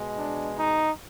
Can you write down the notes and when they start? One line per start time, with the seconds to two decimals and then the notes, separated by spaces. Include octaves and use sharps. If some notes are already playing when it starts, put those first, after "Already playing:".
Already playing: B2 G#3
0.16 D4
0.55 D#4